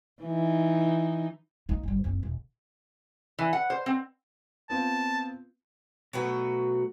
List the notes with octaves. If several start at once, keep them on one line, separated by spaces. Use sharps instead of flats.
E3 D#4
A#3 D#4
G1 G3
F#1 C4
E1
E3
F#5
C5
C4
B3 C4 F4 A5
B2 F#3 A3 F#4 B4